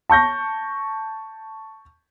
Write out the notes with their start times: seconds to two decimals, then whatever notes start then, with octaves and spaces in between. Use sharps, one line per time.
0.10 A5 C#6 G6 A#6